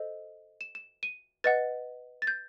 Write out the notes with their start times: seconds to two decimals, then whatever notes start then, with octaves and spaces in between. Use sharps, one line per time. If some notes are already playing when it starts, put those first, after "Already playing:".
Already playing: A4 C5 D#5
0.61 E7
0.75 E7
1.03 D#7
1.44 B4 D#5 F#5 A6
2.22 A6
2.27 G6